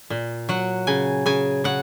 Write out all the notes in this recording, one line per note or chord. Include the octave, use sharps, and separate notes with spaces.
A#2
F#3 F#5
C#3 G#5
C#3 G#5
C#3 F#5